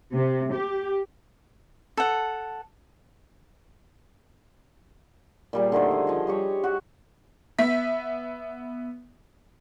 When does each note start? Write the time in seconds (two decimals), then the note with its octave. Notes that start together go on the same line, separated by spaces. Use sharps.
0.13 C3
0.53 G4
1.97 A4 F#5
5.53 A#2 G3 G#4
5.72 D3 D#3 A3 C5
5.91 G#4
6.07 F3 D#5
6.27 G3 G4 C#5
6.64 F#4
7.59 B3 E5 B6